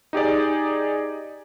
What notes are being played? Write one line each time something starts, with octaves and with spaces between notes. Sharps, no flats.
D#4 G4 G#4 D5